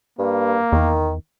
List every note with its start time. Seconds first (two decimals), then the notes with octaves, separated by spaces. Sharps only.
0.19 G2 A#3
0.72 E2 D#3